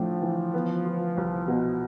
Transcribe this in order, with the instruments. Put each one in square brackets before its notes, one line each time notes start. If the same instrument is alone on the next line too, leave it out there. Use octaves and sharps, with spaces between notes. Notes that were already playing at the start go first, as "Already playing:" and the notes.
Already playing: [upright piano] A2 A3 D4 [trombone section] F3
[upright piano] E3
B3
F4
C2
B2